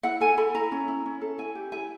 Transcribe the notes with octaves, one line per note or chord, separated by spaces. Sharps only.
E4 F#5
A4 G#5
A4 B5
E4 A#5
C#4
E4
C#4
A4
E4 G#5
G4
E4 G#5